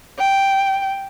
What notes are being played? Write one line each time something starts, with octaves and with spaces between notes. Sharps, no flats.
G5